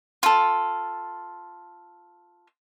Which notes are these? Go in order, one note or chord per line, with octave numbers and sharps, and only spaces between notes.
F4 A4